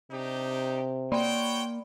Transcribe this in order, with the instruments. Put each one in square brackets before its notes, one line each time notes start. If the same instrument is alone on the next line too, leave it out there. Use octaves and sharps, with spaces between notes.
[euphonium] C3 [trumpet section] D4 D#4 G4
[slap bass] A#3 [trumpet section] F#4 C#5 G5 [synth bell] D5 B5 C6